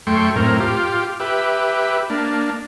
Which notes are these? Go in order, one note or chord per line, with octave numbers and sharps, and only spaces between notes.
F#2 A3 G5 C6 C#6
F#2 A2 C4 A#4
F4 G4
G4 B4 E5
A#3 D4